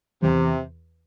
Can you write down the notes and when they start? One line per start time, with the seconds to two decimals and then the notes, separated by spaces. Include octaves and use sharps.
0.22 E2 C3